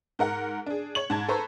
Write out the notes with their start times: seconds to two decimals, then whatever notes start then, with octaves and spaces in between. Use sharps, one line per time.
0.19 G#2 A#4 F#5
0.66 D4 G#4
0.95 C#5 C#6 F#7
1.10 G#2 A5 G#6
1.29 A4 B4 C5 A#5 C#6